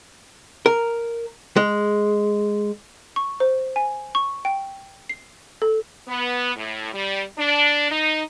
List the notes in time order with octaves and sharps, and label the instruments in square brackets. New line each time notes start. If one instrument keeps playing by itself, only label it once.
[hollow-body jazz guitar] A#4
G#3
[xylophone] C#6
C5
G#5
C#6
G5
C7
A4
[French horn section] B3
A2
G3
D4
D#4